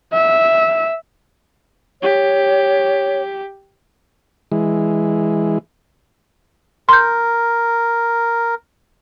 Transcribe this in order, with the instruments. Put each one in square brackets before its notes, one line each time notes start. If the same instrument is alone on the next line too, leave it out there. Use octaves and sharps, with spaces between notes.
[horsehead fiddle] E5
[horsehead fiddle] G4 [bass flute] C#5
[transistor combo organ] E3 G#3
[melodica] A#4 [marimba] C6 G6